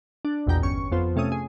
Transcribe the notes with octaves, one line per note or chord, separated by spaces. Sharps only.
D4
A#1 E2 B2 G5 A#5
G1 C#4 C#6
F2 B3 F4 C5
C3 A3 C#4 D#6
G#4